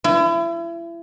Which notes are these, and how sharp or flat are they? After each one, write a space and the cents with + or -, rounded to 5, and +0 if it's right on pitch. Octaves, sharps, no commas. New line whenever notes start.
E4 +35